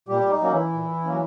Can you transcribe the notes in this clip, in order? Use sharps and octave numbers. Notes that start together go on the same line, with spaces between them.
A#2 G3 G4
D#4
F#3 A#3 C#4
E3 E4
A#2
F#3 A#3 C#4